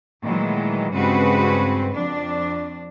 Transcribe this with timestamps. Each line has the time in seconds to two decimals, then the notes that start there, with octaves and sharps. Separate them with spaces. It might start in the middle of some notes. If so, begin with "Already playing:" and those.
0.22 A#2 D#3 E3 F#3 G#3 A3
0.93 G2 C#3 G#3 C4 F#4 B4
1.94 F2 D4